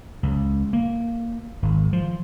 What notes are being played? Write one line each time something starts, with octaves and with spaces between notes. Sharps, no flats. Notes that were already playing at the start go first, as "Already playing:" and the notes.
C#2
A#3
G#1
F3